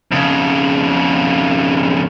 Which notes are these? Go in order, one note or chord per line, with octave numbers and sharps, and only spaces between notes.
F2 C#3